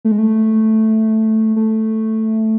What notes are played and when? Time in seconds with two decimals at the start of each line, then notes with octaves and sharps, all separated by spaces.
0.05 A3
0.12 G#3
0.18 A3
1.56 A3